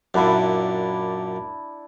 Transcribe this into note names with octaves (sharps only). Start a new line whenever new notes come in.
F#2 A#2 D4 E4 D5